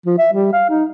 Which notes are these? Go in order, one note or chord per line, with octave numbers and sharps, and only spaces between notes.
F3
E5
G3
F5
D#4